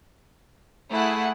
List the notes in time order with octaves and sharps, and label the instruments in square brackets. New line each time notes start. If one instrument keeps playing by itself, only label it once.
[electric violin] A3 [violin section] E4 G#4 F#5